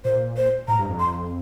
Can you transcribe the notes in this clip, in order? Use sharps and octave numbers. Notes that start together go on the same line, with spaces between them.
A#2 C5
C5
A2 A#5
G2
F2
C6